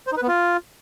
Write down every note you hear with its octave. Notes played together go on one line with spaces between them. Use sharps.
C5
D#4
B4
B3
F4